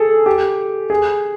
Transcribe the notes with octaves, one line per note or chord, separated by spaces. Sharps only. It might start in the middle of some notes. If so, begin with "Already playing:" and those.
Already playing: G#4 A4
G4
G#4